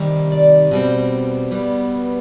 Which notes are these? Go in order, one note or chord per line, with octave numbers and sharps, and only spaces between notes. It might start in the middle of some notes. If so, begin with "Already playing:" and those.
Already playing: C3 D#3 G3
D5
B2 G3 C4
B2 G3 B3